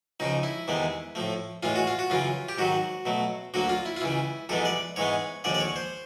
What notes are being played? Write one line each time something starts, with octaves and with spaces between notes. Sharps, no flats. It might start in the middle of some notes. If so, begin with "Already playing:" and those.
C#2 C#3 F3 D#4
E4
E2 C3 D#3 G#3 B3
A2 F3 A3
A2 E3 G#3 F4
F#4
F4
F#4
F#2 C#3 E3 F4
G4
G#2 D#3 F#3 F#4
B2 F#3 A3
D2 D3 F#3 A#3 F#4
F4
E4
F4
C#2 C#3 E3 E4
F2 C3 E3 G#3 B3 A4
D5
G#2 E3 G#3 B3 C#5
D#2 D3 F3 G#3 D5
D5
C#5
C5